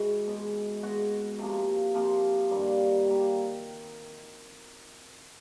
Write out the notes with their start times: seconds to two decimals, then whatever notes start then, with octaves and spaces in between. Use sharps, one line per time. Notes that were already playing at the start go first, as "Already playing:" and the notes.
Already playing: G#2 E3 G#3 F#4
0.27 B2 G#3
0.83 B2 G#3 F#4
1.39 C3 F3 A#3
1.94 C3 F3 A#3 F4
2.50 G2 D#3 G3 A#3
3.06 D#3 G3 A#3 G4